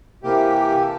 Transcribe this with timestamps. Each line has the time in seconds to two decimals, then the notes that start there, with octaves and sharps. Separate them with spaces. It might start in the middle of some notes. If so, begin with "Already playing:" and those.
0.23 C3 E3 A#3 G4
0.80 A4